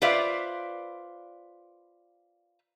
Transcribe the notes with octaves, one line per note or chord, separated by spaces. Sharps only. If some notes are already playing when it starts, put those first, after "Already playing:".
F4 B4 C5 D5 E5 F5